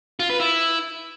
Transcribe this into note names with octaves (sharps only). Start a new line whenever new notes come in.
F4
B4
E4